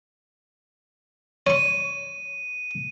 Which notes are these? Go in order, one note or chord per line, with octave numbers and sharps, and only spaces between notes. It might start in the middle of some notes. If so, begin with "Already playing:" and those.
C#5 C#6 D#7